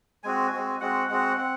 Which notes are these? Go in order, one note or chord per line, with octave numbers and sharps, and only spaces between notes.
G#3 C4 F#4 G#5
G#3 C4 F#4
G#3 C4 F#4 F#5
G#3 C4 F#4 F#5
C4 F#5